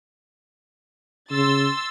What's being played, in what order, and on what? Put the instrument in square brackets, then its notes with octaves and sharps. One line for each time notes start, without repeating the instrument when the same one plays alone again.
[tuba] C#3 [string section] C6 E6 A6